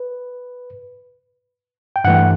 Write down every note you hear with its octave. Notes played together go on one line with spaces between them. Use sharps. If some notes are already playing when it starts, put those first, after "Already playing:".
Already playing: B4
G5
G2 E3 A3 F#5